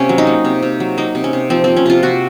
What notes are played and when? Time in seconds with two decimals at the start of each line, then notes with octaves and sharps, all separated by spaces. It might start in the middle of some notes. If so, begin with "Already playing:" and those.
Already playing: C3 A#3 C#4
0.09 F#3
0.18 D#4
0.27 A#3
0.45 C3
0.62 C3
0.80 F#3
0.97 A#3 D#4
1.15 C3
1.24 C#4
1.33 C3
1.50 F3 C4
1.64 A#3 C4
1.77 C#4
1.86 C3 F4
2.03 C3 F#4